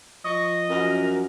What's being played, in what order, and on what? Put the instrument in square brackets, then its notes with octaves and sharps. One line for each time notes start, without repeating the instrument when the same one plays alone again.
[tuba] F3 [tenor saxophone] D#5 [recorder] C#6
[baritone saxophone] F#2 [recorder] A#4